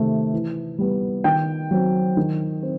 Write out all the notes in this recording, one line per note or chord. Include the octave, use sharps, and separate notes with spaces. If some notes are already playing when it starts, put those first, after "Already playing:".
Already playing: C3 D#3 A3
E3
G3 B3
D#3 G5
F#3 C4
D#3
C4